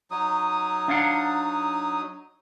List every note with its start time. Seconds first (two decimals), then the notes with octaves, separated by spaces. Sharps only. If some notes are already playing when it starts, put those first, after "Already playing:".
0.11 F#3 D#4 D#6
0.88 D4 F5 F#5